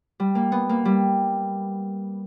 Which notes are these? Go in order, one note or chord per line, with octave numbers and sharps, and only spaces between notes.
G3
A#3
B3
A#3
G3